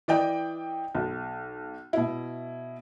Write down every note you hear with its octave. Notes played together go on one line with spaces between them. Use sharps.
E3 D5 D#5 G5
B1
B2 E4